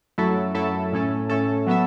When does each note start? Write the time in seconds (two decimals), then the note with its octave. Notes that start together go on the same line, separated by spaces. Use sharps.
0.18 F#2 F#3 A3 E4 A4
0.55 F#2 F#3 A3 E4 A4
0.92 A2 A3 C#4 A4
1.30 A2 A3 C#4 A4
1.67 F#3 B3 A4 E5